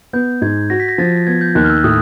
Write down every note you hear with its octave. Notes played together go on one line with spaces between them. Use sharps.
B3 G6
G#2 G#6
F#4 A#6
B6
A#6
F3 A6
B3 G#6
G6
D#2 F#6
F6
E6
A2 D#6